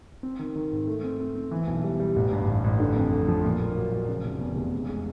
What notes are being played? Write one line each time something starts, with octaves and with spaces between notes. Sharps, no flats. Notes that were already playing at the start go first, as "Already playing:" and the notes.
C4
D#3
D#3
G#2
A3
C4
C4
C4
E3
B1
G3
G3
A1
G2
A1
A1
D3
F2
A3
F3
A#2
A#3
F#3
F#3
C#3
F1
E2
F1
G#3
G#3